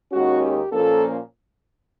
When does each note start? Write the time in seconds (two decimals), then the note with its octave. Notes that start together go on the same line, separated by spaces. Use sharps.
0.12 D#2 D#3 G#3 C#4 F#4
0.42 G4
0.72 A#2 F3 A#3 C#4 A4